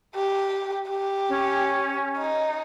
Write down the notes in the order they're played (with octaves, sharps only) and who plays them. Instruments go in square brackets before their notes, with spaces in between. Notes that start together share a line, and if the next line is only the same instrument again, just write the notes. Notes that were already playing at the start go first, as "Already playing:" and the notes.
[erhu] G4
G4
[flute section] C#4
[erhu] D#4